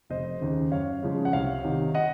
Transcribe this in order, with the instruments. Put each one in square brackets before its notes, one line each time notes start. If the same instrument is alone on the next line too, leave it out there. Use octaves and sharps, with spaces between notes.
[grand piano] F1 C5 D#5
D#2 C#3
F#2 C#5 F5
C#3 F3 G#3
F#5
C2 C#5 F5
C3 D#3
D#5 F#5